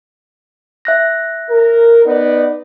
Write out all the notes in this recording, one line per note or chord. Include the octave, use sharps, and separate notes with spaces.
E5 F#6 A#6
A#4
B3 D#4 D5